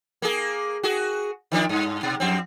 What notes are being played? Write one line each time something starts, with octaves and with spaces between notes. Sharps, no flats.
A#3 G#4
F#4 G#4
D#3 F3 D4
G2
B2
F2 C4